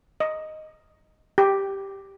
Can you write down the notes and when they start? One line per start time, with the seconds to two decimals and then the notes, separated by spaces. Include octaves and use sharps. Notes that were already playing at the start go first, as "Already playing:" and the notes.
0.20 D#5
1.38 G4